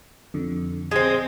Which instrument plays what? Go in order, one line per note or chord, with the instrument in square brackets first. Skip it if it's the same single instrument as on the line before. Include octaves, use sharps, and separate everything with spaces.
[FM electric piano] F2 D3
[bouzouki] G#3 C4 [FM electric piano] D#5